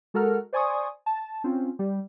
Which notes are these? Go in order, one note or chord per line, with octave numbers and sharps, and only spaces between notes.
G#3 F#4 A4 A#4 F#5 F6
C5 D5 G#5 C6 C#6 D#6
A5
C4 C#4 F4
G3